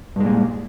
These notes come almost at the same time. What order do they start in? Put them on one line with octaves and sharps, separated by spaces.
G2 G#3 A#2